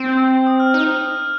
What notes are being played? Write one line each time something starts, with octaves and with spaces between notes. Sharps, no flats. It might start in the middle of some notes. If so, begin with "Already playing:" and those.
Already playing: C4
G6
D#6
F6
D#4 F6